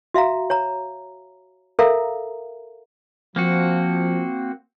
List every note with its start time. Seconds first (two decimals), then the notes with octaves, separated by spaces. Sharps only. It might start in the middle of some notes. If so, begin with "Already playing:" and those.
0.14 F#4 E5 F5 A#5
0.50 C#5 A#5
1.79 A4 A#4 E5 F5 A#5
3.36 F3 A#3 C4 F#4